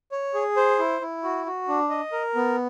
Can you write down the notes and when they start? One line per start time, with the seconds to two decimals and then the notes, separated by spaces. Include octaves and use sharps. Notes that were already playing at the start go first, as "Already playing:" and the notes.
0.12 C#5
0.34 G#4
0.56 C5
0.79 E4
1.01 E4
1.23 F#4
1.46 F#4
1.68 D4
1.90 D#5
2.12 A#4
2.35 B3